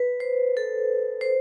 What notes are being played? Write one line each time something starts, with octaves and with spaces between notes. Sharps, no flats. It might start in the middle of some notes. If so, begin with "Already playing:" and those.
Already playing: B4
C5
A4
C5